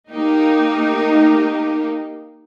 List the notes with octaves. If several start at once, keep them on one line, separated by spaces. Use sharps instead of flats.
A#3 D#4 G4 A#4